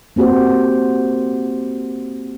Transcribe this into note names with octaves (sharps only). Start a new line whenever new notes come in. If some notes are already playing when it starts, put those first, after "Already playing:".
A#3 C4 F#4 G4 C5